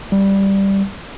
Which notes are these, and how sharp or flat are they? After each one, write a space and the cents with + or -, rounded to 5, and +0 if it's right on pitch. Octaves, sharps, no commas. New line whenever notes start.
G3 +0